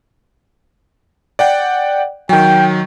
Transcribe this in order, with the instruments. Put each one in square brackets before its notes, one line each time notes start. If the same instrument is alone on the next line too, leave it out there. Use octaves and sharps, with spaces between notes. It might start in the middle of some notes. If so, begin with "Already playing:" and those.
[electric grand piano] D5 F#5 G5
[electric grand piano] D#3 F#3 [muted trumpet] G5